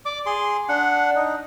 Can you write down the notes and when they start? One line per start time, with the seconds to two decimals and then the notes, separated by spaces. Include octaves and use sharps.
0.05 D5 D6
0.26 G#4 C6
0.69 D4 F#5
1.15 D#4